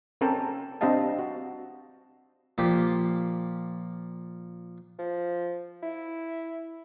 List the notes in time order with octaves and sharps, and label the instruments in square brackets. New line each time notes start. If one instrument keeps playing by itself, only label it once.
[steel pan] C4 C#4 A4 A#4 G5 A5
C4 D4 G4 D#5 F5 A5
F#4
[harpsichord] A#2 F3 G4
[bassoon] F3
E4